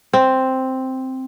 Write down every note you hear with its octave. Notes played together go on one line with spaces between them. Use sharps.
C4